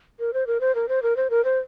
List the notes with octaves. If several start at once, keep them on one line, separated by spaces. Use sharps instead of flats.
A#4
C5
A#4
C5
A#4
C5
A#4
C5
A#4
C5